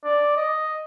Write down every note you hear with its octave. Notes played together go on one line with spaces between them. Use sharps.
D5
D#5